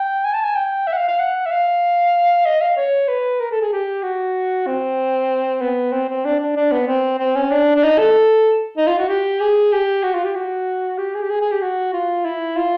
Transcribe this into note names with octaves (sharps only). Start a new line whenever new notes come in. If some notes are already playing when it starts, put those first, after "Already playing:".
Already playing: G5
G#5
A5
G#5
G5
E5
F#5
F5
F5
F#5
E5
F5
D#5
F5
C#5
B4
A#4
A4
G#4
G4
F#4
C4
B3
C4
C4
D4
D4
D4
B3
C4
C4
C#4
D4
D4
D#4
A4
D#4
F4
F#4
G4
G#4
G4
F#4
F4
G4
F#4
G4
G#4
G4
G#4
G#4
G4
F#4
F4
E4
F4